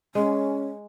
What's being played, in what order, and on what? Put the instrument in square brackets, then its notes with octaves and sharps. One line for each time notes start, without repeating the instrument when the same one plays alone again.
[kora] G#3 [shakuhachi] C#4